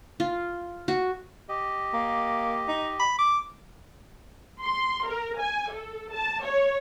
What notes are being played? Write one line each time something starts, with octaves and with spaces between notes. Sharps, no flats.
F4
F#4
G4 D#5
A#3
D#4
B5
D6
C6
A#4
G#5
A4
A5
C#5